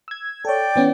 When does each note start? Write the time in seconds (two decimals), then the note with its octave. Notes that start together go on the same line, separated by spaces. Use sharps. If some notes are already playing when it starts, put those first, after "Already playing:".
0.08 E6 G#6
0.45 A4 C#5 D5 G5
0.76 E3 B3 C#4